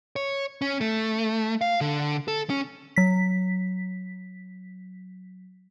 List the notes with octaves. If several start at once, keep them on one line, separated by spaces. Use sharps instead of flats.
C#5
C#4
A3
F5
D3
A4
C#4
F#3 B6